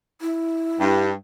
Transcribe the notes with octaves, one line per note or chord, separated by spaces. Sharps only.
E4
G2